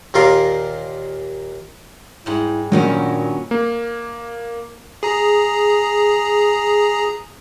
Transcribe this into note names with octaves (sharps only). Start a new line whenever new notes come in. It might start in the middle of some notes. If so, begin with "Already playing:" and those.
D#2 A#2 F4 A#4 F5 C6
G#2 G3 E4
G2 A#2 D#3 F#3 C#4
A#3
G#4 A#5